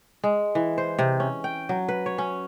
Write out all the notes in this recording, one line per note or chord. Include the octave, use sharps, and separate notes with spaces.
G#3
E3
C5
C3
C#4
G5
F#3
B4
C#5
C#4